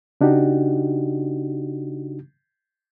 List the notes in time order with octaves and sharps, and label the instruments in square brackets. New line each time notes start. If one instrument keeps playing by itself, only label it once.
[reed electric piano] C#3 D4 D#4 F#4 G4